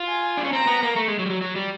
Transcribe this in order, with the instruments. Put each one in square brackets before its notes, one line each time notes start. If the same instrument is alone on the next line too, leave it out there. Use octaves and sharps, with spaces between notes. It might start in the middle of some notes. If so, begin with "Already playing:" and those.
Already playing: [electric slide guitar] F4
[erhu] G#5
[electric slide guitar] D4
C#4
[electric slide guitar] C4 [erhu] A#5
[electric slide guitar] B3
A#3
A3
G#3
F#3
G3
F#3
F#3
G3